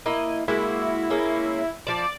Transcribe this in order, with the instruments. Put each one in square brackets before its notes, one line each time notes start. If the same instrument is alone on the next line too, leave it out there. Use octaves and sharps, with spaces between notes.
[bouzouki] A#3 E4 D#5
[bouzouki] G#3 A#3 F#4 [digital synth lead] E4
[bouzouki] G#3 A#3 C#4
[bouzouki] F3 A5 [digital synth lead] D5